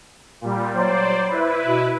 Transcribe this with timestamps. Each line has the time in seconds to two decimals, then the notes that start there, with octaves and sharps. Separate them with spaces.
0.41 A#2 G3
0.74 F#3 C5 D5
1.28 E4 B4
1.64 B2